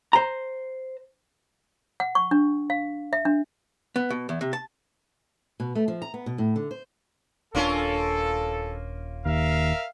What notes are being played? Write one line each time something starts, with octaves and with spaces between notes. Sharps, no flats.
C5 A#5
F#5
C#6
D4
F5
E5
D4
B3
B2
E2
C3
A5
B2
A3
F3
A#5
B3
B2
A2
D3
C5
D#1 A#3 C#4 D4 F4 A4
D#2 A#4 E5 F5